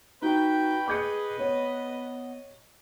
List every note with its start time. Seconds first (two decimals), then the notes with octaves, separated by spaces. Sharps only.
0.22 D#4 F#4 B4 G5
0.88 G#4 D#5 D6 G6 C#7
1.39 B3 C#5